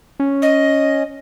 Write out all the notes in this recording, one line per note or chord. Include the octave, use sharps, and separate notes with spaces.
C#4
D#5